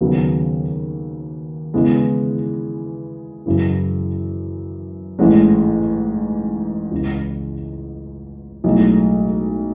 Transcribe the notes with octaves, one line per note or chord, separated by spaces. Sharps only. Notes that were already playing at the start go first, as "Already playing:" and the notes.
D#2 C#3 F#3 B3
C#3 E3 G#3 B3
F#2 C#3 E3
A1 G#2 E3 G#3 C#4
C#2 C#3 E3
B1 A2 G#3